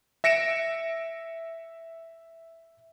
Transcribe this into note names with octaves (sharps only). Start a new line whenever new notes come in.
E5 A#6 C#7 D7 E7